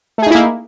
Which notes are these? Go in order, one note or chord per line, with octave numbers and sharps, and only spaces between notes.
A3 A#3 D#4 E4 G#4